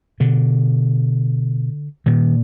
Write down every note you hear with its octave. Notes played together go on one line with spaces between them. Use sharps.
B2 D3
A#2 D#3